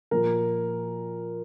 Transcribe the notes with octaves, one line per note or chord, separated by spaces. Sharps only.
A#2 F3 A#4